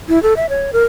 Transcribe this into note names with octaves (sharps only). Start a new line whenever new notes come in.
E4
A4
E5
C#5
A#4